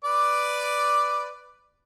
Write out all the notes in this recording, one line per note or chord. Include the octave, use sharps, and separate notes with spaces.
B4 D5 D6